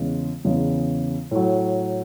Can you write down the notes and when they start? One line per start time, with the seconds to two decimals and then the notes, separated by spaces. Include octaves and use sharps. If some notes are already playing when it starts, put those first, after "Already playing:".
Already playing: E2 C#3 G#3
0.45 E2 C#3 G#3
1.31 A2 F#3